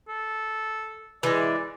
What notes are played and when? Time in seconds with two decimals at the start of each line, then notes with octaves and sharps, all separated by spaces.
0.08 A4
1.23 E3 G#3 D5